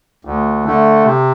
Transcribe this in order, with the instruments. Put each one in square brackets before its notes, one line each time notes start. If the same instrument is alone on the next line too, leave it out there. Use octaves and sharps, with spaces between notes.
[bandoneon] D2
D3 A3
C3